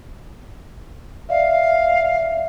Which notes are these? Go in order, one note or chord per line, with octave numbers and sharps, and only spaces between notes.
D5 E5 F5